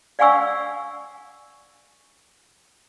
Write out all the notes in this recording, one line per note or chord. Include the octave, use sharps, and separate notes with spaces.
D5 F5 F#5 G#5 C#6 E6